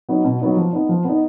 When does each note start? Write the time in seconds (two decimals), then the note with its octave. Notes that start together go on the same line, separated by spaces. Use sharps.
0.09 F#3 B3 D#4
0.24 B2
0.41 F#3 B3 D#4
0.57 F3
0.73 B3 D#4
0.89 F3
1.04 B3 D#4